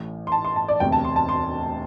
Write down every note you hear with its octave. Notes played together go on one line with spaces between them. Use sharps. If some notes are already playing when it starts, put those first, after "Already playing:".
Already playing: A1 A2 A3
C6
A5
C6
A5
D5
E1 D2 C3 G5
A5
C6
A5
C6